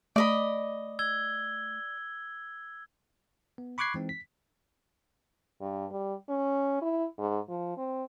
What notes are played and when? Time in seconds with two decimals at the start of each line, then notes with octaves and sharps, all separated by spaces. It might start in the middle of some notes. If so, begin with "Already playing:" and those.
0.16 A3 D5 D#5 B5
0.99 E6 G#6 G7
3.58 B3
3.78 B5 C#6 D6 F#6 G#6 C7
3.94 E3 G#3 C4 D#4
4.09 B6
5.61 G2
5.91 G3
6.29 C#4
6.82 E4
7.18 G#2
7.49 F3
7.77 C4